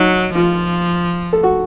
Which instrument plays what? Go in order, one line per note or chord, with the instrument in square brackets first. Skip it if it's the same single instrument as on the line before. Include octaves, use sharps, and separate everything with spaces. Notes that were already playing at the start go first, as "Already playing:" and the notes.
Already playing: [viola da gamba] F#3 [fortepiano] D#4
[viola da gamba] F3 [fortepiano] F4
[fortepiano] A4
F#4